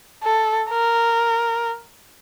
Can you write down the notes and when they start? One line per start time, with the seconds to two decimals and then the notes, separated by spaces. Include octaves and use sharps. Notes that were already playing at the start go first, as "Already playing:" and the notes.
0.23 A4
0.70 A#4